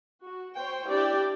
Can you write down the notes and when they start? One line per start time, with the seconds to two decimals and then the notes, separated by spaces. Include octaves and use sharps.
0.23 F#4
0.58 C5 C#5 G5
0.87 D4 E4 G4 D5 G5